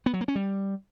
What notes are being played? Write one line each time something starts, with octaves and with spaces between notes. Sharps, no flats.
B3
F#3
A#3
C#4
G3